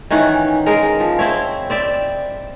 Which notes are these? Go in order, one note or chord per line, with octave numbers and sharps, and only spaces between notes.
D#3 E3 C#4 F#5
G#3 A#4
F3
C4 E4 C#5
C4 D5 E5